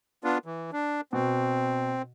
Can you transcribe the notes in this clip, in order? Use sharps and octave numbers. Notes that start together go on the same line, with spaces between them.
B3 D4 F4
E3
D4
B2 C4